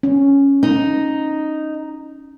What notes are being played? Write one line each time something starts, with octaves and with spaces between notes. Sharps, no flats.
C#4
D#4